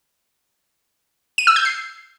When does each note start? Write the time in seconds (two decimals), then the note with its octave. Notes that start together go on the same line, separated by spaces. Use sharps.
1.38 D#7
1.47 E6
1.56 G6
1.65 C7